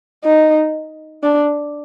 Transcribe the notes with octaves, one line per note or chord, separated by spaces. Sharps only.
D#4
D4